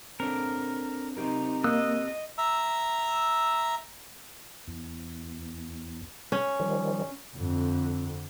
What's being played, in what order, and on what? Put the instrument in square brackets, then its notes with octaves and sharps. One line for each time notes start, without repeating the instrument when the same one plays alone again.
[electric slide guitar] C4 D4 A4 [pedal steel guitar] A#4
[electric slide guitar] C4 G4 A#4 [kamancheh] D#4
[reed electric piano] A#3 [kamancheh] D#5 [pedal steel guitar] D#6 E6 F#6
[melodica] E5 A#5 E6
[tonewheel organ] E2
[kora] C#4
[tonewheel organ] D#3 F3 G3
[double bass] F2 D3